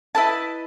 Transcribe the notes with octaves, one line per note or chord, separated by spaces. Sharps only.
E4 B4 D#5 A5